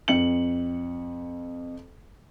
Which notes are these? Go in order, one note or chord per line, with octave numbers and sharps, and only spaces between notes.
F2 C#7 F#7